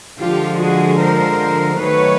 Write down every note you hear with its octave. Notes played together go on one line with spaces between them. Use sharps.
D3 F3 G#3 F4 G4
F#4 G#4
A#4 C5
D#3 F#3 A3 B4 C#5